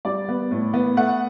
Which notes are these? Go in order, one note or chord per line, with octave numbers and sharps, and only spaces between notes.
G3 D5
B3
A2
B3
A3 F#5